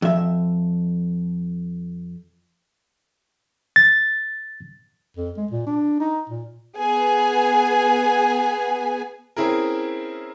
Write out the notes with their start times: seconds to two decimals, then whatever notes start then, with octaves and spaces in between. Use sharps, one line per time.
0.02 F2 E5
3.76 A6
5.16 F2
5.37 G#3
5.51 A#2
5.67 D4
6.00 D#4
6.29 A#2
6.78 B3 G#4 G#5
9.37 C4 C#4 E4 G#4 A#4